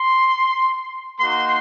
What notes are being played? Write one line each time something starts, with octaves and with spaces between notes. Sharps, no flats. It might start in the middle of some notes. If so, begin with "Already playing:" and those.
Already playing: C6
A#3 D#4 F#4 C6